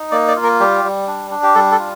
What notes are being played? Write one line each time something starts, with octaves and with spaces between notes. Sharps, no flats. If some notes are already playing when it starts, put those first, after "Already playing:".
Already playing: D#4
A#3 D5
D5
F4
A#4
G3 G4
G3
D4
D4
G4
G3 A4
A4
F4